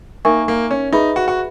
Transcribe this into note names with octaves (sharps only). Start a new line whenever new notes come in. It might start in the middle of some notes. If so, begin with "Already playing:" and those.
A#3 D#4 A#4 E5 G#5 C#6
A#3
C#4
D#4 G#4 B4 E5 B5
F#4
F#4